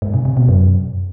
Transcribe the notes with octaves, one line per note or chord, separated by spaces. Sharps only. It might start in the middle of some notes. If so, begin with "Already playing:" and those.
G#2
C3
C3
B2
F#2